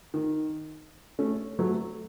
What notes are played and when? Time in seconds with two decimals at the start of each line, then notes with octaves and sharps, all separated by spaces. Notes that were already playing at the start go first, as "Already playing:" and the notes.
0.14 D#3
1.19 A3 C#4
1.59 F#3 A3